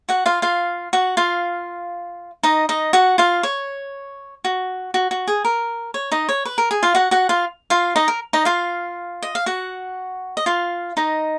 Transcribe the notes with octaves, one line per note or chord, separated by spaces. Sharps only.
F#4 F#5
F4 F5
F4 F5
F#4 F#5
F4 F5
D#4 D#5
D#4 D#5
F#4 F#5
F4 F5
C#5
F#4
F#4
F#4
G#4
A#4
C#5
D#4 D#5
C#5
B4
A#4
G#4
F4 F5
F#4 F#5
F#4 F#5
F4 F5
F4 F5
D#4 D#5
A#4
D#4 D#5
F4 F5
D#5
F5
F#4 F#5
D#5
F4 F5
D#4 D#5